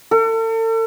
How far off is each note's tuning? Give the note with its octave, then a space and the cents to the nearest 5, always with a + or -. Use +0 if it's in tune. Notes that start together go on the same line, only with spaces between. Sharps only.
A4 +40